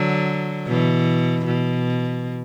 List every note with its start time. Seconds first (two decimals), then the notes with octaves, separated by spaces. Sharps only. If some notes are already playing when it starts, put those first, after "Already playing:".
Already playing: D3 F#3
0.67 B2 E3
1.46 B2